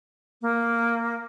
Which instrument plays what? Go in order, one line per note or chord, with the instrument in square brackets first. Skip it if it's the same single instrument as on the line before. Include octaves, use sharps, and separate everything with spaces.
[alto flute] A#3